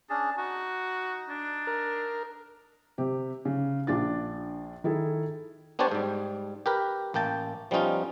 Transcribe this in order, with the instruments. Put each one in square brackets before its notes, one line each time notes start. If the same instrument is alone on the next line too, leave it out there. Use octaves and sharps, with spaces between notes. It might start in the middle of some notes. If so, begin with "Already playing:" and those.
[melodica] C#4 D4 G#4 [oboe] A5
[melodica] D#4 [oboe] F#4
[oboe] D4
[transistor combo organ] A#4
[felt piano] C3 G4
C#3
A#1 D4 F4 A6
D#3 E4 G#4 A4
[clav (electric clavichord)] B3 D4 G4 C5 C#5 A5
G#2 G3
G4 A#4 B4
A1 A#3 G5 A5
F3 G3 B3 C#4 D#4 F4